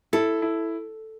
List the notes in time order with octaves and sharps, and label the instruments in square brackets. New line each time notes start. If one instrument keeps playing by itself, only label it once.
[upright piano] E4 [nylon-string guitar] A4
[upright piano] E4